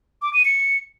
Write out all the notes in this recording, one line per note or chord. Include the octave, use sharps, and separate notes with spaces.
D6
D#7
C#7